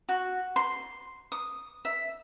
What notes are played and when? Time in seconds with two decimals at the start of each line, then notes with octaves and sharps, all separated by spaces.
0.09 F#4
0.56 C6
1.32 D#6
1.85 E5